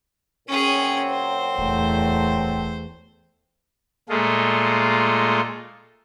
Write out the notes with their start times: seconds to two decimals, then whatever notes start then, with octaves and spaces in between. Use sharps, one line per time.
0.48 A#2 F#3 C4 C#4 G#4
1.11 C5
1.58 D1 E2 A3
4.09 A#2 G#3 A3 F4